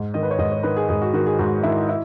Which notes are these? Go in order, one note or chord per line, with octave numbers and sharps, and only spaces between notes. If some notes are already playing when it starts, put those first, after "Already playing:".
Already playing: G#2
D#3 D#5
B4
C#5
G#2 D#5
C#5
D#3 B4
G#4
G#2 G#4
F#4
D#3 F#4
G#4
G#2 F#4
D#3 E4
E4